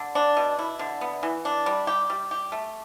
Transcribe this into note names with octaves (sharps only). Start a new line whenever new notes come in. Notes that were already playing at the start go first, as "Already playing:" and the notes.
Already playing: D3
D4
B2
E4
D3
B3
E3
D4
G3
G4
G3
G4
A3